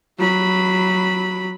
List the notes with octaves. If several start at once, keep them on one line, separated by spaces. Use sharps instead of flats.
F#3 B5